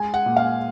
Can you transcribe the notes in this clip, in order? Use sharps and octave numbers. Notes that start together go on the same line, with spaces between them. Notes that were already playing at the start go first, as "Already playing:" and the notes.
Already playing: G#3 G#5
F#5
A#2
F5